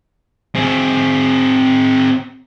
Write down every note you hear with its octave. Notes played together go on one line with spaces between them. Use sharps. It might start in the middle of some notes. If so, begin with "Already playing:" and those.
C4 G#4